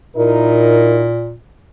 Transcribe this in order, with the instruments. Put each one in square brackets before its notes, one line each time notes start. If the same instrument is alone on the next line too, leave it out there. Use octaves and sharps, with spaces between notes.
[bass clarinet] A#2 [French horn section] D#4 E4 A#4